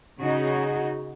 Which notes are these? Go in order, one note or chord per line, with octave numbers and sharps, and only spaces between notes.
C#3 D#4 F#4 G#4